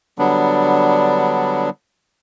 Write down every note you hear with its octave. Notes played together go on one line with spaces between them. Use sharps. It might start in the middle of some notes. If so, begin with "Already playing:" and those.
D3 F#3 G3 B3 D4